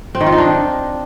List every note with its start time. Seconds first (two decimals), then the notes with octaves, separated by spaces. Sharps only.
0.15 C4
0.21 D#3
0.26 F4
0.32 D#4
0.38 D4